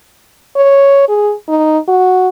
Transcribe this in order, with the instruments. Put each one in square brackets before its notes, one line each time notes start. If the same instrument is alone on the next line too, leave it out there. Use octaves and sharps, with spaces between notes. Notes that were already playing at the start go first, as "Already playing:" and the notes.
[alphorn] C#5
G#4
D#4
F#4